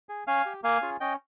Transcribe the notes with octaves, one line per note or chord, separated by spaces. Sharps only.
G#4
C#4 F5 G#5
G4
A#3 F5 G#5
C#4 F4 G#4
C#4 D#5 G5